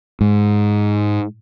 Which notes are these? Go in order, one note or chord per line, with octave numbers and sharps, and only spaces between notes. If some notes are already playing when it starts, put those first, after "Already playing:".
G#2